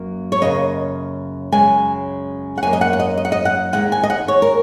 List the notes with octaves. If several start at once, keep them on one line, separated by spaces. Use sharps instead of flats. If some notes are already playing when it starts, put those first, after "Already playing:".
Already playing: F#2 F#3 A#3
C#5
F#2 C#3 A#3 D#5
F#2 C#3 G#3 G#5
F#5
F#2 D#3 F#3 A#3 G#5
D#5
F#5
F#5
D#5
D#5
F#5
D#5
F#5
D#2 D#3 G#3 F#5
G#5
D#5
F#5
C#5
A#4